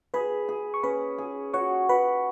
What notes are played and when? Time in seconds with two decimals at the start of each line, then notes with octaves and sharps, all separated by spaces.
0.14 G#4 B4 B5
0.48 G#4
0.74 C#6
0.83 C#4 B4 B5
1.18 G#4
1.53 F#4 C#5 C#6
1.89 F#4 B4 B5